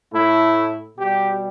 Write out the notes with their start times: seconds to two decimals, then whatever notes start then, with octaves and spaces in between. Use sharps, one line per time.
0.13 A2 A3 E4
0.98 B2 G3 G4